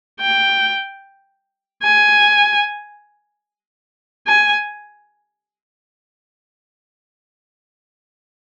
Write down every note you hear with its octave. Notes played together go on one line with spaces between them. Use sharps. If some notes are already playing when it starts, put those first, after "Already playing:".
G5
G#5
G#5